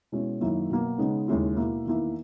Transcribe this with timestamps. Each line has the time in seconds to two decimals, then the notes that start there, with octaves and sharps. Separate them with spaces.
0.12 B2 G#3 C#4 E4
0.41 F#2 D#3 A#3 E4
0.70 B2 F#3 A#3
0.98 C#3 G#3 B3 D#4
1.28 D#2 C#3 G#3 C#4 E4
1.56 B2 A#3 E4
1.85 E2 D#3 A#3 E4